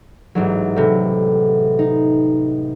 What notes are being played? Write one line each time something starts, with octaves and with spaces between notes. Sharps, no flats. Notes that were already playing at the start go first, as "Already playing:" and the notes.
A1 G#2 F#3
A2 C3
D#4